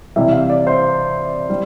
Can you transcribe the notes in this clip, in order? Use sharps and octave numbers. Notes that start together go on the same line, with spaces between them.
C3 E3 G3 E5
F5
D5
C5
G3